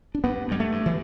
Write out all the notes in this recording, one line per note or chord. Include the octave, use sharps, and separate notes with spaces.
D4
G2 B3
G2 G3
A3
G2
E3